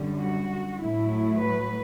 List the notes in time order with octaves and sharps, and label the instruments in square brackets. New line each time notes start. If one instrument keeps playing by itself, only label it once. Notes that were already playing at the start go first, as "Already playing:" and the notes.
Already playing: [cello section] F#2 D3 G3
F#4
A2 F#3 A3 E4
B4